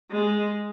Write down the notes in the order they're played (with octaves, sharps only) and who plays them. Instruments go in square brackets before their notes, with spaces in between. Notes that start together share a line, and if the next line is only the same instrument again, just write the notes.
[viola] G#3